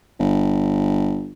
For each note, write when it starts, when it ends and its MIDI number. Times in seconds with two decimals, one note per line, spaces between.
0.20 1.32 31